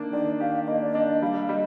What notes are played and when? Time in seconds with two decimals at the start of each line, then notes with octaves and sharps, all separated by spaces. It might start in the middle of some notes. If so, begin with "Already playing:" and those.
Already playing: D#3 A#3 D4
0.13 D#3 D5
0.40 G4 F5
0.67 A#3 D#5
0.81 D5
0.94 D4 D#5
1.08 D#5
1.22 G3 F5
1.49 G3 D#5